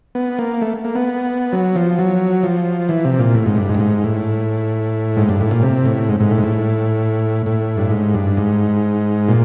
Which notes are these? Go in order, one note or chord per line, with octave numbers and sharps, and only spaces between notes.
B3
A#3
A3
A#3
B3
F#3
F3
F#3
F3
E3
C3
A#2
A2
G#2
G2
G#2
G2
G#2
A2
G#2
G2
A2
A#2
C3
A2
G#2
G#2
A2
G#2
A2
A2
G2
G#2
G2
G#2
A#2